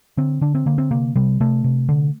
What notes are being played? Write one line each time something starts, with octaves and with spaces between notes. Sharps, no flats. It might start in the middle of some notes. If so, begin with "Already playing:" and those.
D3 C4
D3 D4
C4
D3 A#3
C4
C3 A#3
C3 G3
C3 A3
C3
D3